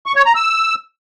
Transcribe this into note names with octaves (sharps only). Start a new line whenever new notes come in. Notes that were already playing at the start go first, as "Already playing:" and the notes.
C#6
C#5
A#5
E6